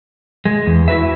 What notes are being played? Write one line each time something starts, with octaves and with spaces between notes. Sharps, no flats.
G#3
E2
E4 F#4 B4 E5